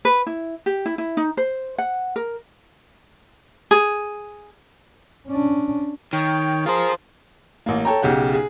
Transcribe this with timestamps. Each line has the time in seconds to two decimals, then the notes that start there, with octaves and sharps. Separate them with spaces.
0.05 B4
0.27 E4
0.66 G4
0.86 E4
0.98 E4
1.17 D#4
1.37 C5
1.78 F#5
2.16 A#4
3.71 G#4
5.28 C#4 D4
6.13 D#3 C#5 G5
6.66 F4 G#4 A#4 C5
7.66 A1 A#3
7.85 A4 C#5 G5 A#5
8.02 B1 C#3 G4 F#5
8.34 G#4